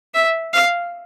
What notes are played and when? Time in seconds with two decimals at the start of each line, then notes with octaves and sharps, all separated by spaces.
0.14 E5
0.53 F5